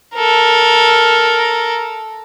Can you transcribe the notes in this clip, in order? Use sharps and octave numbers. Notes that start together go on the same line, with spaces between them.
A4 A#4